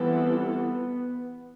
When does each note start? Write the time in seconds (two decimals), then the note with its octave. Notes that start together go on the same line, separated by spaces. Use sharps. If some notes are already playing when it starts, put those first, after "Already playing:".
Already playing: E3 G3 B3 C4 F4 A4
0.32 B3